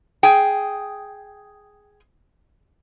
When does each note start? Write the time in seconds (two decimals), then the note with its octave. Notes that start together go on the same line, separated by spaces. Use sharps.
0.23 G#4 G5